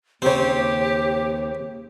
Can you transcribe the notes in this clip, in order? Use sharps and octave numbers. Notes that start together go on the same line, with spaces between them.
D#2 C#3 C4 G4 C5 C#5